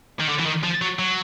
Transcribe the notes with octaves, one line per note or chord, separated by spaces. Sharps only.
D#3
D3
E3
D#3
F3
F#3
F#3